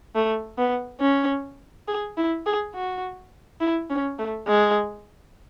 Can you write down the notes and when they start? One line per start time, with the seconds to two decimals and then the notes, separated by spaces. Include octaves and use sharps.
0.15 A3
0.58 B3
1.01 C#4
1.88 G#4
2.17 E4
2.46 G#4
2.75 F#4
3.61 E4
3.90 C#4
4.19 A3
4.48 G#3